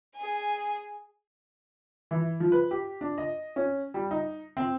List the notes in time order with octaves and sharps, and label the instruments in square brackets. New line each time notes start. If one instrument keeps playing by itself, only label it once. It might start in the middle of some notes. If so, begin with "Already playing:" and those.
[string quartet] G#4 G#5
[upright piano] E3
F3
B4
G4
D4
D#5
C#4
G3
D#4
C4